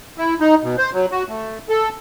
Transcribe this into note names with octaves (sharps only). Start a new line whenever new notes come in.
E4
D#4
B2
C5
F#3
F#4
A3
A4